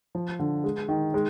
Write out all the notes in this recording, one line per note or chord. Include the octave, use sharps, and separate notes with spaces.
F3
D3
G#3
D#3
G#3